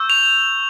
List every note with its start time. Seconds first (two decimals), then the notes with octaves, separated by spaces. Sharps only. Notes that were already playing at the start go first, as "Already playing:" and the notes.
Already playing: C#6 E6 G6
0.10 F7